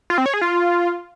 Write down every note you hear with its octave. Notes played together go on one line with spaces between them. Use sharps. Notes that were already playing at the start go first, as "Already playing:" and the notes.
F4
C4
C#5
G#4
F4